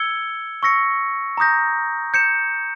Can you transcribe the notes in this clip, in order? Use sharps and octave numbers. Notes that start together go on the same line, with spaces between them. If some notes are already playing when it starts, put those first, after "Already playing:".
Already playing: E6 G#6 C#7 G7
C#6 E6 A#6 C#7
A#5 D#6 G6 A#6
G6 C#7 E7